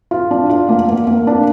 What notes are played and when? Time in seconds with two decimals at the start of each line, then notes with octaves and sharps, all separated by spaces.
0.11 F4
0.31 D4
0.49 F4
0.69 A#3
0.89 A#3
1.07 A#3
1.27 D4